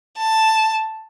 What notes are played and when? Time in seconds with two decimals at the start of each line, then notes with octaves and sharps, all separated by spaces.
0.17 A5